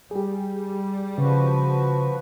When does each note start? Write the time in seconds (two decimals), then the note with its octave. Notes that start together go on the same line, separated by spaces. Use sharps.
0.11 G3 G4 G#4
1.18 C#3 F3 F#4 B4